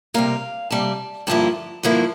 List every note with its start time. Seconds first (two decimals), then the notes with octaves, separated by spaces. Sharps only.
0.14 C3 G3 A#3 F5
0.70 C3 G3 A#3 A5
1.27 G2 D3 F3 A#3 E4 A5
1.83 G2 D3 F3 A#3 E4